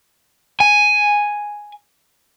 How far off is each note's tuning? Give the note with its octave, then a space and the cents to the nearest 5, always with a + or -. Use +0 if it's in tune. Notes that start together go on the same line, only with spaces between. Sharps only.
G#5 +0